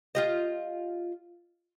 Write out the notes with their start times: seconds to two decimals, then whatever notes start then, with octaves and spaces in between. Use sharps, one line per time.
0.15 F4 G4 D#5